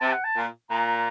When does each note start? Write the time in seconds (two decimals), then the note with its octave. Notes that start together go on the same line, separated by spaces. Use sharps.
0.01 C3 A5
0.13 F#5
0.25 A5
0.35 A#2
0.70 A#2 A#5